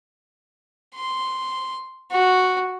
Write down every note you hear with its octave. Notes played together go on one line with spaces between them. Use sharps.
C6
F#4